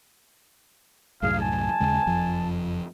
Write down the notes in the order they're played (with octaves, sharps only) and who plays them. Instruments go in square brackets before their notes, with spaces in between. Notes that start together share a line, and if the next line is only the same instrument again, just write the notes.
[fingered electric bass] C2 F#2 A2 [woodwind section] G#4 F5
[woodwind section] G#5 A5
[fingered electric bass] D#2 C#3 G#3
F#1 F2 F3